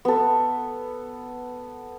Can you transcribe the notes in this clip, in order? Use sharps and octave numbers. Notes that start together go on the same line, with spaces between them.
B3 A4